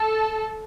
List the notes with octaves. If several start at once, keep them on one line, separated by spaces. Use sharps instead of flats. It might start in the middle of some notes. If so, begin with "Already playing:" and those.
Already playing: A4